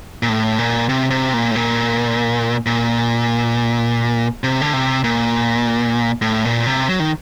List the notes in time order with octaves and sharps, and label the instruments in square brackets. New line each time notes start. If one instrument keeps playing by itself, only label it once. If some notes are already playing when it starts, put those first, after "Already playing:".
[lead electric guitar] A#2
A2
A#2
C3
C3
A#2
A2
A#2
A#2
C3
D3
C3
A#2
A2
A#2
C3
F#3
D#3